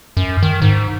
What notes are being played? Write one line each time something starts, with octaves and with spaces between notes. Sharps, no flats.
F#2
D#3
G#2